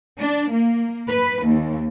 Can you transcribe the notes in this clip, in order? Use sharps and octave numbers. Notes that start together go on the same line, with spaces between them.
D4
A#3
B4
D#2